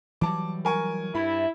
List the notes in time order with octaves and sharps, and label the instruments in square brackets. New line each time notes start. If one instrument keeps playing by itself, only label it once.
[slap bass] E3 F#3 G3 [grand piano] A5 D6
[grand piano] A#4 G#5 C#6
[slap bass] G2 [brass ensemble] E4 [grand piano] B5